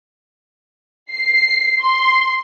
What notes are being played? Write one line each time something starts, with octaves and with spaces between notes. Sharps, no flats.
C7
C6